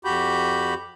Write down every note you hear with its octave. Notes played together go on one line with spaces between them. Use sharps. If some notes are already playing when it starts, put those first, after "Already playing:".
F2 F#4 G4 B5 G6